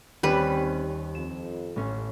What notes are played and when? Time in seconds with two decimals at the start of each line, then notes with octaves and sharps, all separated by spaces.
0.23 D#2 G3 C4 C#4 B4
1.15 F2 E7
1.76 A1 C#4